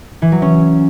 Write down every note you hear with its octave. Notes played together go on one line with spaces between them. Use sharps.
E3
F#3
C#4